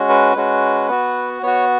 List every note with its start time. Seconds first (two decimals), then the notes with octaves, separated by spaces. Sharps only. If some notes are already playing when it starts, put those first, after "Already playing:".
Already playing: G#3 C#4 F#4
0.09 B4
0.36 G#3 C#4 F#4
0.89 B3 F#4
1.43 B3 F#4 C#5